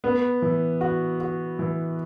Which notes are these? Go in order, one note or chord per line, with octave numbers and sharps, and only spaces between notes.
B3
E3
F#4
F#4
E3